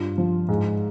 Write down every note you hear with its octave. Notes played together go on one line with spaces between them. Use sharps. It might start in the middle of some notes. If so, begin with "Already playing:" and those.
Already playing: G2 F4
F3
G#2